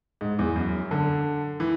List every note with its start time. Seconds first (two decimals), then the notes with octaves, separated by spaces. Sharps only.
0.21 G#2
0.39 E2
0.56 F#2
0.91 D3
1.60 E3